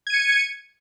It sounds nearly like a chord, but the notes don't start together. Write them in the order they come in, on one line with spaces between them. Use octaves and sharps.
G#6 D#7 C#7